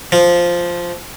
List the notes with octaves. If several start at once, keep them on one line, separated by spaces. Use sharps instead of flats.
F3